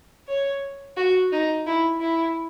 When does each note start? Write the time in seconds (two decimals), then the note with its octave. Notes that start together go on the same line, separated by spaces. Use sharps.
0.28 C#5
0.97 F#4
1.32 D#4
1.66 E4
2.00 E4